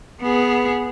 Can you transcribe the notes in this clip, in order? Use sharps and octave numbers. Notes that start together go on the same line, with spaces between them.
B3 G#4